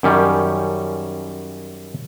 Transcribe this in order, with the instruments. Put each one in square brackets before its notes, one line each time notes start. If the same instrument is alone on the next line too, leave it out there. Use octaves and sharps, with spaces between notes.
[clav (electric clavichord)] F#2 D#3 G3 C#4